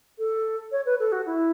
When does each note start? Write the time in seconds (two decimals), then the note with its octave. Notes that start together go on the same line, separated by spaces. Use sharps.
0.18 A4
0.71 C#5
0.85 B4
0.99 A4
1.12 F#4
1.25 E4